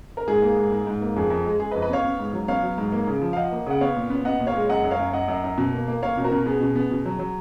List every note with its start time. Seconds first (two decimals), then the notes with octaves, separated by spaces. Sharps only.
0.17 A#4
0.28 G#2 G#4
0.42 A#3
0.57 G#2
0.72 G#2
0.87 G#2
1.01 A#3
1.16 F2 G#4
1.30 F2
1.46 G#3
1.60 G#3 G#4
1.71 B4 D#5
1.75 F2
1.82 B4 D#5
1.90 B3 C#5 F5
2.04 B3
2.19 G#2
2.33 F#3
2.48 B3 C#5 F5
2.63 F#3
2.78 G#2
2.92 A#3
3.07 C#3
3.22 F3
3.33 F5
3.36 F3 D#5 F#5
3.51 A#3
3.66 C#3 F#5
3.81 B3 C#5 F5
3.96 A#2
4.10 B3
4.25 B3 D#5 F#5
4.40 A#2
4.47 C#5 F5
4.55 G#3
4.69 F#2 D#5 F#5
4.84 F#2
4.91 C#5 F5
4.99 F#2
5.13 F#2 D#5 F#5
5.28 F#2
5.44 F#2
5.58 B2
5.73 A#3
5.88 A#3
6.02 A#3 C#5 F5
6.17 B2
6.24 F#4 A#4
6.32 B2
6.46 B3 G#4
6.61 B2
6.76 B3
6.91 B2
7.06 F#3
7.19 F#3